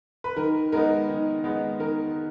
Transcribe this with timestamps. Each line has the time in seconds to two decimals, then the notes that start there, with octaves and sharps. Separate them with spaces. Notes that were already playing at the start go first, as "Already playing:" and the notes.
0.24 B4
0.36 D#3 A#4
0.72 G#3 B3 D#4 A#4
1.09 D#3
1.44 G#3 B3 D#4
1.79 D#3 A#4